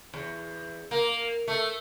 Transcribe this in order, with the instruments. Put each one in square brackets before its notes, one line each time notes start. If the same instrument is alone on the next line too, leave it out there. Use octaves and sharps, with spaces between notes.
[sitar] E2
A#3
A3